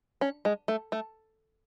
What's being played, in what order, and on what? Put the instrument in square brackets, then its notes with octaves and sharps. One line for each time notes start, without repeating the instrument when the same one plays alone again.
[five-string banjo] C#4
G#3
A3
A3